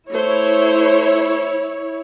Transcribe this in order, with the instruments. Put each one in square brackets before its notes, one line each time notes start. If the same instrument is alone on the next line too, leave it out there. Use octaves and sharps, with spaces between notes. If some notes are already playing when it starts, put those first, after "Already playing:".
[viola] A3 C5 [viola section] E4 C#5